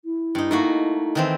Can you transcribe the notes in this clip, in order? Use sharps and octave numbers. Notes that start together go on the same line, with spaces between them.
E4
G2 D#4
A3 A#3 D#4 F#4
D#3 E3 C4